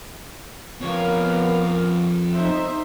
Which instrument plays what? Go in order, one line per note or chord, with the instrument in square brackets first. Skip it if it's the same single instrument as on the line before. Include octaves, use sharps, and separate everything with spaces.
[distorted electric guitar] F2 C#5 [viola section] B3 A#4 F5
[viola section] D#4 C5 E5